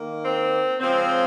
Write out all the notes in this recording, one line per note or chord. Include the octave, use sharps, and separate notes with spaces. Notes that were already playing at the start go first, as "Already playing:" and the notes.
Already playing: D#3 A#3
C4
C#3 F3 G#3 C4